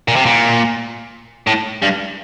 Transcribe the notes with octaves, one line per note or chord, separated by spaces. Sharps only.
A#2
C3
A#2
A2
G2